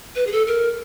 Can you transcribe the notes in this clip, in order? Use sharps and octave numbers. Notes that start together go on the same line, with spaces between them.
B4
G#4
A4
A#4